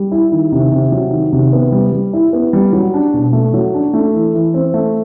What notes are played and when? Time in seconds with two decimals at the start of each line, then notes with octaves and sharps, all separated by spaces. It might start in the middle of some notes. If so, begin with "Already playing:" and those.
Already playing: G3
0.12 E4
0.32 D#3
0.52 C3
0.72 C3
0.92 F#3
1.12 D#3
1.33 C3
1.53 B3
1.72 G3
1.92 G3
2.13 E4
2.33 B3
2.53 G3
2.73 F#3
2.94 D4
3.14 B2
3.33 A3
3.53 F#3
3.74 D4
3.94 A3
4.14 E3
4.34 E3
4.54 C4
4.74 A3